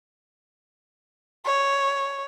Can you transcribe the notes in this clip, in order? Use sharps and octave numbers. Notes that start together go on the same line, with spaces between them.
C#5